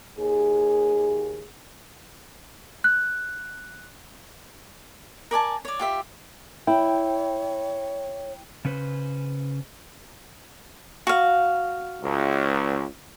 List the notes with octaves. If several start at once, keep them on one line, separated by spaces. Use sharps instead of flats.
D#2 G#4
F#6
A#4 D5 G#5 A5
C#5 D5
F4 G4 E5
E4 C#5 G5
C#3 C#4 B4 C5
F#4 F5
C#2